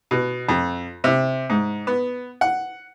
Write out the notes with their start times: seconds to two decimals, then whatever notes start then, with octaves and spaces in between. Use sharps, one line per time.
0.11 B2
0.49 F2
1.04 C3
1.50 G#2
1.87 B3
2.41 F#5